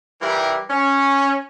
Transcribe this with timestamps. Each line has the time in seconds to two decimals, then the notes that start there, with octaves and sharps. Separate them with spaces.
0.22 E3 G3 E4 F4 G4 A#4
0.70 C#4